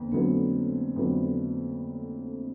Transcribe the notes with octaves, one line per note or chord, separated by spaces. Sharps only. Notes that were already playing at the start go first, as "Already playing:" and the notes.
Already playing: F2 D3 A#3 B3
F2 D3 F#3 A3 B3
F2 D3 F#3 B3